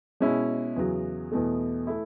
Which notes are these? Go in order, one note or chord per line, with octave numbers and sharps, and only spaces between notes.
B2 G#3 C#4 E4
E2 C#3 F#3
E2 B2 A3
A3 E4